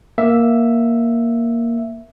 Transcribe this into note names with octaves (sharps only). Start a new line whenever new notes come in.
A#3 E5